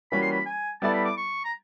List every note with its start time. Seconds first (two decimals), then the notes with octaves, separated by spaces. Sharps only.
0.11 E3 G3 A#3 C#4 F#4 B5
0.22 C6
0.31 B5
0.46 G#5
0.82 G3 B3 E4 A4 D5 A5
0.93 B5
1.05 D6
1.17 C#6
1.44 A#5